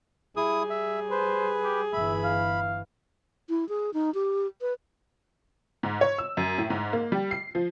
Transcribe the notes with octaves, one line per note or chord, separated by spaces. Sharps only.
G3 E4 G#4 D#6
E5
B4 C5
G4
G1 E3 E5 B5
F5
E4
G#4
D#4
G4
B4
G#2
C#5
E6
F#2
A2
G#2
A#3
G3
C7
F3